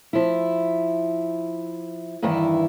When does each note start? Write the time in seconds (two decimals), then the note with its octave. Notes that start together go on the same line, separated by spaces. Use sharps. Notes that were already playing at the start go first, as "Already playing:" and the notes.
0.13 F3 E4
2.22 E2 G2 D#3 E3 E4